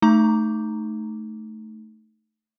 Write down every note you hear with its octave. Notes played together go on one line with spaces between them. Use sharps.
A3 D#4 A#5 D6